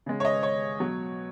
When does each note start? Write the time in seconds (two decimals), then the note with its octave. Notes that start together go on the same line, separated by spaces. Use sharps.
0.06 C#3 G#3
0.20 C#5
0.25 D#5
0.43 C#5
0.80 B2 F#3